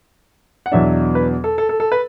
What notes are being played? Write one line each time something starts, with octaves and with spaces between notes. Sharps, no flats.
F#5
E2 B2 F#3 D4 E5
B4
A4
A4
A4
A4
B4